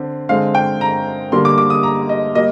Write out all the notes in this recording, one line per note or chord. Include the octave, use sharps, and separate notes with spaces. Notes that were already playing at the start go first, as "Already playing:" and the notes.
Already playing: D3 C4
D3 G#3 C4 F5
G5
A#5
D3 G3 A#3 C6
D6
D6
D#6
A#5
D#5
G3 A#3 D#5